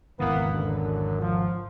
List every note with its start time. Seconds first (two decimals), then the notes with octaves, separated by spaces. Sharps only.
0.20 G#1 E2 C#3 E3 A#3 B3
0.53 F#2 D3
1.21 F3